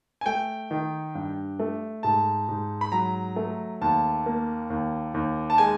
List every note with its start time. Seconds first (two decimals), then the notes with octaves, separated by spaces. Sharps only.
0.21 G#5
0.26 A3 G5
0.71 D#3
1.15 G2
1.59 A3
2.03 G#2 A5
2.48 G#2
2.81 B5
2.92 F#3 A#5
3.36 A3
3.81 D#2 A5
4.26 A#3
4.70 D#2
5.14 D#2
5.50 A5
5.58 G#3 G#5